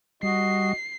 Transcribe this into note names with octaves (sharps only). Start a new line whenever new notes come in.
G3 F#4 D#5 C7